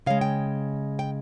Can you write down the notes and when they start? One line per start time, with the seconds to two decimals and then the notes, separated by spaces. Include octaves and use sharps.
0.06 C#3 G#3 F5
0.21 G5
0.99 G5